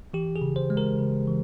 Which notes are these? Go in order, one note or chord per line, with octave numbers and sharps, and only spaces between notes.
E3 G4
G#4
C#3
C5
G#3
A#4
C#3
E3